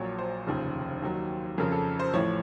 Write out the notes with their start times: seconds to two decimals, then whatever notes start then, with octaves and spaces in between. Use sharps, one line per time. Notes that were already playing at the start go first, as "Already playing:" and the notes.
Already playing: A#1 A#2 F#3 C#5
0.18 C5
0.47 F1 D#2 C#3 F3
1.02 D#2 D#3 F#3
1.58 F2 C#3 F3 A#4
1.72 A4
1.99 C5
2.14 A1 A2 F3 C#5